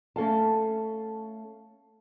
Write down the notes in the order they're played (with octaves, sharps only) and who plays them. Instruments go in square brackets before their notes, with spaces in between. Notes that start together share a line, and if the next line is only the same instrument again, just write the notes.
[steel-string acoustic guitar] A3 C#4 A4 F5 A5